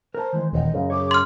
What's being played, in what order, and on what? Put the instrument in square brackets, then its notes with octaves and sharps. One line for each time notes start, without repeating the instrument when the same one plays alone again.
[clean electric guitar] A#4 A5 [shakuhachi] C5
[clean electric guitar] D#3 E3 G#3
[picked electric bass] D#1 [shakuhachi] D#5
[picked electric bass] F#2 C#3
[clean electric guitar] G#4 C#5 [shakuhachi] D6
[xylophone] C6 F6